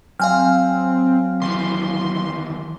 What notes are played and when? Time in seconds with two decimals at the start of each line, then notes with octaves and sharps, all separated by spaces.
0.20 F#3 C4 F5 G#5 F6
1.42 D#2 E3 C6